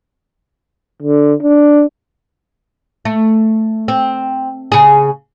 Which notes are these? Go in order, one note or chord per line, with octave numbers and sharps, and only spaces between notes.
D3
D4
A3
C4
C#3 G#4